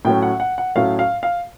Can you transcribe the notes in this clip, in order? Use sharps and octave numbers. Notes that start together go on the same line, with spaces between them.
A2 F#3 A3 C#4 G5
F#5
F#5
F#5
A2 F#3 A3 C#4 F5
F5
F5